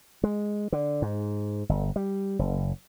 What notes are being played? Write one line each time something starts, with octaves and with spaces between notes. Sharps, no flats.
G#3
D3
G#2
G1
G3
F#1